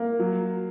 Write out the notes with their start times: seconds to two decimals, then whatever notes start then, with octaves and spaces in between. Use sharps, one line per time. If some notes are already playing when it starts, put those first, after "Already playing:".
Already playing: A#3
0.19 F#3